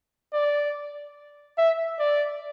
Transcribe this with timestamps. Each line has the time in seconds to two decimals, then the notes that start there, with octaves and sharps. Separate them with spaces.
0.33 D5
1.58 E5
1.99 D5